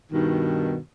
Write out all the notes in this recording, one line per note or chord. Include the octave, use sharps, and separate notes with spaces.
G2 B2 D#3